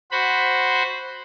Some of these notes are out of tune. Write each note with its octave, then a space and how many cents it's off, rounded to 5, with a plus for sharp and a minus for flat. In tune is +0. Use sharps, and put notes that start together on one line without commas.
F#4 +0 C5 +0 B5 +0